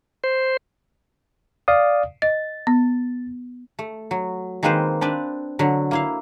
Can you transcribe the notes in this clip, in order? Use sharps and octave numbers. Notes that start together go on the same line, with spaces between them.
C5
D5 F5 D#6
D#5 A6
B3
A3
F#3
D#3 G#3 A#3 C4 B4 C5
C4 D4 B4 D5
D3 F#3
A#3 E4 F5